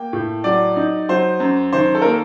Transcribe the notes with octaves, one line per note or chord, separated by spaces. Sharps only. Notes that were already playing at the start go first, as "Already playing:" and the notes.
Already playing: A#3 G5
A2
F#3 D5
D#4
F#3 C5
F#2
D#3 C5
A4
A#4
A#3 A4